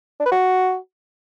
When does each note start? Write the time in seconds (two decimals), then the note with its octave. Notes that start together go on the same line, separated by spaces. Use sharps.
0.20 D4
0.26 B4
0.32 F#4